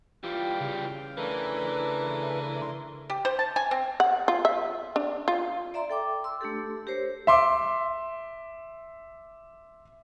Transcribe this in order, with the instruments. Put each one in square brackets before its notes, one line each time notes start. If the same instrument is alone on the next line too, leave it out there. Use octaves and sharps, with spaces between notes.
[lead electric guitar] E3 G3 [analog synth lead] F4 [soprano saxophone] G4 [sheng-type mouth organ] F5 G5
[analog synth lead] C#3
[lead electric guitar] E3 [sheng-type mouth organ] A3 D4 A#4 [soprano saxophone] B4
[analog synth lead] C6
[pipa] G4
C5
A5
G#5
C4
[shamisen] F#5
F4
E5
D4
F4
[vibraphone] D5 E5 A#5 C6
A4 G5 D6
C6 E6
A3 D4 G4 A4
G4 A#4 C5 C#5
[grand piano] E5 C6 D6